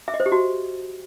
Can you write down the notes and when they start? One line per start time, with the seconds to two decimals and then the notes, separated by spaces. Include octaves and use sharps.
0.08 E5
0.14 D#5
0.20 C5
0.26 G4
0.32 F#4